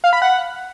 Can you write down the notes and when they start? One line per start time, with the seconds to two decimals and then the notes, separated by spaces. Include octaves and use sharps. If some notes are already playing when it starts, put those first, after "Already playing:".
0.04 F5
0.13 B5
0.22 F#5